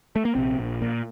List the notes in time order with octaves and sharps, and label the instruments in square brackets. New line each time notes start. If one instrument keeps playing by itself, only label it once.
[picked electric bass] A3
A#3
A#1 C3 C4
A#1
A#2